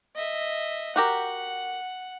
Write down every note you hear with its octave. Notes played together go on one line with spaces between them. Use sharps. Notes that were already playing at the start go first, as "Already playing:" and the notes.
D#5 E5
F#4 G4 A#4 F#5